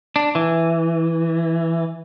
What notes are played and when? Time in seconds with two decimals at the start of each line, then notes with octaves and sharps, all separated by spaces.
0.16 D4
0.35 E3